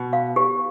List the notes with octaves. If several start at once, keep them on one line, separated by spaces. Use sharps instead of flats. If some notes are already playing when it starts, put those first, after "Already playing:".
Already playing: B2
F5
G4